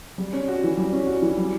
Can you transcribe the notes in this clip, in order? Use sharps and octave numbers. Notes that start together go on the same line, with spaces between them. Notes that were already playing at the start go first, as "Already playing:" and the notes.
G3
C#4
F#4
E3
G3
C#4
F#4
E3
G3